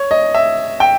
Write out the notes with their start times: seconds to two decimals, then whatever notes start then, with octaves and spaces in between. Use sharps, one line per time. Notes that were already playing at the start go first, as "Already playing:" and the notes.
Already playing: C#5
0.11 D#5
0.35 E5
0.80 G5